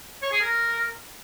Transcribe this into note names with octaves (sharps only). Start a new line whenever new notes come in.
C#5
G#4
A#4